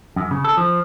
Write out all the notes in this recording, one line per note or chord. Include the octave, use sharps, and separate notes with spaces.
F#2
C#3
A4
F3